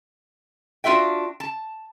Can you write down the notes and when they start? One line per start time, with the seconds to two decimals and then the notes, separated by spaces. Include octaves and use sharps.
0.84 D4 F4 F#4 E5 G5
1.40 A5